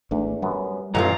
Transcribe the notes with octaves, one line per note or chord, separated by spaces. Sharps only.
G#1 E2 A3 D4
F#2 G3 B3
A1 F#2 A#2 D#3 A3 F4 A#5